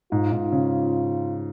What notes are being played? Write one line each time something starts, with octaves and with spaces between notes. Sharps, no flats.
G#2 F4
G#2
C#3